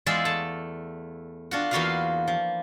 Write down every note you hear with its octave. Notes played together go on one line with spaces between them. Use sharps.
E2 G#3 F4 G#4 D5 E5
A3 A5
D4 F4 F#4
E2 A#3 F4 F#4 B4 F5
F3